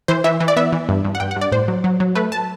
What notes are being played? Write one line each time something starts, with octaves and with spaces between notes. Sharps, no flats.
E3 C5
E3 E5
E3
D5
B3 E5
E3
G2
G2
F#5
G2 G5
F#5
G2
D5
A2 C5
F#3
F#3
F#3
A3 B4
A5